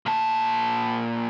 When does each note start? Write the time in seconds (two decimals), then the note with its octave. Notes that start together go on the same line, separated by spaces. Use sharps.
0.06 A#2 A5